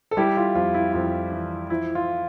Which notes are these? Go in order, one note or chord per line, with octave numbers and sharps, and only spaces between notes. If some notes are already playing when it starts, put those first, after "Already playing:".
A4
G3 E4 G4
F4
F2 F4
E4
F2 F4
E3
F3 E4
F4